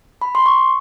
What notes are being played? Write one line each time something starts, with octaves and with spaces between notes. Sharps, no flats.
B5
C6
C#6